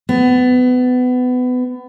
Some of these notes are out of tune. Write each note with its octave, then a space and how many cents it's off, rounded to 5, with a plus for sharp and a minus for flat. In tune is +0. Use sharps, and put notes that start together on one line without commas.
B3 +25